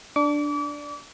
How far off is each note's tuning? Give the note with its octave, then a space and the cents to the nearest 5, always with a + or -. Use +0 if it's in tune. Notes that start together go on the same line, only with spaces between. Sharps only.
D4 +0 D6 -35